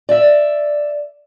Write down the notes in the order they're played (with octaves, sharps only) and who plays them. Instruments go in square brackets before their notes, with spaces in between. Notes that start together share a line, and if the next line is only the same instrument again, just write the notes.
[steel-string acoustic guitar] D5 E5